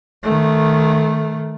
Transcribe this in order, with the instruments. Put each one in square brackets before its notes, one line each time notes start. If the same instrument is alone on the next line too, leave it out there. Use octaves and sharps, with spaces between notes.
[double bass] D#3 A3